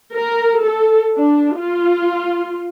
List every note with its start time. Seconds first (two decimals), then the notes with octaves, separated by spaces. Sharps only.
0.13 A#4
0.62 A4
1.18 D4
1.56 F4